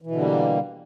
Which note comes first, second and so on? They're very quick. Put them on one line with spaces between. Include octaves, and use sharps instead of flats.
E3 B2 D3 G3 A#3